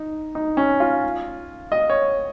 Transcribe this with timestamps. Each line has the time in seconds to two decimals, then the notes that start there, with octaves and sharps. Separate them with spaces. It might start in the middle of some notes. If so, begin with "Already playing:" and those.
Already playing: D#4
0.35 D#4
0.57 C#4
0.80 F4
1.72 D#5
1.90 C#5